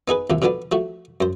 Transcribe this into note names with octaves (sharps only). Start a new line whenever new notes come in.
B3 D#4 G#4 B4
D#2 C3 F3
B2 D3 F3 B3 D4
F3 A3 F#4
F#2 C5